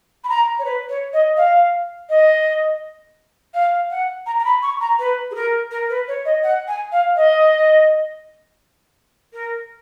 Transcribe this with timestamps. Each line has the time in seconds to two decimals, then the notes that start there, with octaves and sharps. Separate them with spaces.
0.24 B5
0.29 A#5
0.59 C#5
0.65 B4
0.89 C#5
1.13 D#5
1.37 F5
2.09 D#5
3.54 F5
3.90 F#5
4.26 A#5
4.39 A#5
4.44 B5
4.62 C#6
4.81 A#5
4.99 B4
5.31 G#4
5.35 A#4
5.71 A#4
5.90 B4
6.08 C#5
6.25 D#5
6.43 F#5
6.68 G#5
6.92 F5
7.16 D#5
9.33 A#4